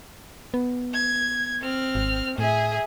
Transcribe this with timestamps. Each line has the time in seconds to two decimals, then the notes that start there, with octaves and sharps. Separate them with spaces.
0.54 B3
0.94 G#6
1.62 C4 F6
1.95 G#1
2.38 A2 G#4 E5